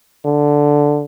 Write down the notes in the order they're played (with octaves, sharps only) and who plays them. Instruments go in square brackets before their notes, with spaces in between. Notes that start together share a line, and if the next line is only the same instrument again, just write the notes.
[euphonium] D3